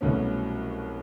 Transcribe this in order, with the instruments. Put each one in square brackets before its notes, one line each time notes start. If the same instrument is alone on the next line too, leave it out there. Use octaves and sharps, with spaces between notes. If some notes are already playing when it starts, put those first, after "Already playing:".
[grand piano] C2 B2 F#3 A3 C#4